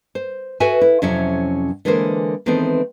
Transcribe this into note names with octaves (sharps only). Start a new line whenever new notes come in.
C5
F#4 A4 B4 E5 G5 G#5
E4
F2 C3 F#3 C#4 E4 E5
D3 E3 G#3 A#3 A#4 C5
D#3 E3 G#3 B3 C4 A4